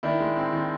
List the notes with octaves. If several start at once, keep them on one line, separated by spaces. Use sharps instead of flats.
D#3 D4 E4
G#3
C4
D#3